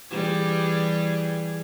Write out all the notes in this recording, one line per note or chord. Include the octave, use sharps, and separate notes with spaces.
E3 G3 G#4